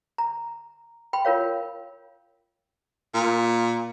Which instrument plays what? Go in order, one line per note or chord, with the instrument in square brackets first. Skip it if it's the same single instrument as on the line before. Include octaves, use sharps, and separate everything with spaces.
[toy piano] A#5
G5 B5 C6
F4 A#4 C#5 F5
[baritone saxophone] A#2